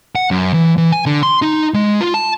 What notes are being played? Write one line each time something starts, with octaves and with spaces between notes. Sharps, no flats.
F#5
F#2
E3
E3
G#5
D3
C6
D#4
G#3
F4
A5